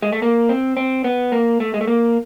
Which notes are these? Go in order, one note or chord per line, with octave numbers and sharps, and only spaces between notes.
G#3
A3
A#3
C4
C4
B3
A#3
A3
G#3
A3
A#3